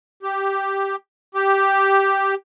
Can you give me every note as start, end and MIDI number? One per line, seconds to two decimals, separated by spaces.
0.23 0.96 67
1.35 2.35 67